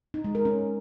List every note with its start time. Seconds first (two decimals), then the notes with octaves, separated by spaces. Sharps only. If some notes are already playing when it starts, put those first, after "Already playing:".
0.14 D#4
0.24 G#3
0.35 A#4
0.45 C#4